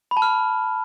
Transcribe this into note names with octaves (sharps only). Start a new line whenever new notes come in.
B5
A5
F6